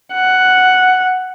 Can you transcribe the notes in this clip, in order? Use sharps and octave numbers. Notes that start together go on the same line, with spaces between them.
F#5